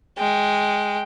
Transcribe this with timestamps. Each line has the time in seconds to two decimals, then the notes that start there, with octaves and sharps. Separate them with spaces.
0.18 G#3 G5